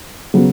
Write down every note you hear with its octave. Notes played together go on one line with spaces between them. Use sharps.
C#3 F#3 B3